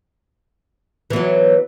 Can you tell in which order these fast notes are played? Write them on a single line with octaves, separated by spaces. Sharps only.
E3 B3 F#3